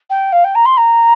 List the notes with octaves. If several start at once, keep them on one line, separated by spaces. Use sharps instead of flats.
G5
F5
G5
A#5
C6
A#5